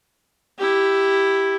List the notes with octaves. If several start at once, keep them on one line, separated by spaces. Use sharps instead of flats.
E4 G4